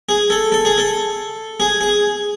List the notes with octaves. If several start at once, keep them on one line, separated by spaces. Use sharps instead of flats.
G#4
A4
A4
G#4
A4
G#4
G#4